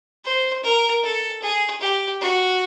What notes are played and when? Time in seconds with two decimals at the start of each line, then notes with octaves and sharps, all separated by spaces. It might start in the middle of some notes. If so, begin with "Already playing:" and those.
0.25 C5
0.63 A#4
1.03 A4
1.42 G#4
1.81 G4
2.21 F#4